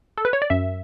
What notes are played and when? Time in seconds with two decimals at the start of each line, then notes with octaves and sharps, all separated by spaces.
0.18 A4
0.25 B4
0.33 C#5
0.42 D5
0.50 F#2 E5